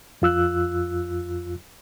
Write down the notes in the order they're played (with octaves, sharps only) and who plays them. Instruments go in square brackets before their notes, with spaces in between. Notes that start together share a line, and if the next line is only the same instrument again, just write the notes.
[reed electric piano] F2 F4 E6 F#6